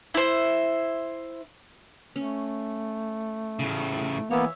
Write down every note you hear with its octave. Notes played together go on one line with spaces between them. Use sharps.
E4 C5
A3 C#4
A2 C#3
E3 A#3 B3 C#5 E5